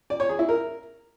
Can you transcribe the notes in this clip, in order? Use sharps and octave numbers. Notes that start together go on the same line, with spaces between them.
D5
C#5
G#4
E4
A#4